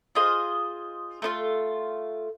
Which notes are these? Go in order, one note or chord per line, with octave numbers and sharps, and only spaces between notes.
F4 G#4 C5 D#5
A3 D4 F4